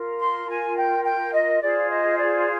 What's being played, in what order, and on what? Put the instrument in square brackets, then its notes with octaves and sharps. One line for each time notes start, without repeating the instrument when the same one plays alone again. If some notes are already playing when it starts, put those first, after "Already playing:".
Already playing: [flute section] F4 A#4
C6
G#5
G5
G5
D#5
F4 G#4 C5 D5
D#5
D5